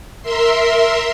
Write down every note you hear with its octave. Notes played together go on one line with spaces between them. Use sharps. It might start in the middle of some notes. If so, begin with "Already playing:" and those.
A#4 E5 C6